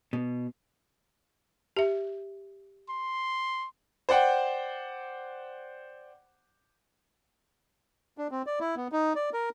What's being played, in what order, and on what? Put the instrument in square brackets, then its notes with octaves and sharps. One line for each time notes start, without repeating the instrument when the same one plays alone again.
[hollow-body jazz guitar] B2
[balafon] G4 E5
[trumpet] C6
[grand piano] C5 D5 F#5 G5
[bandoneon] D4
C4
D5
E4
B3
D#4
D5
A#4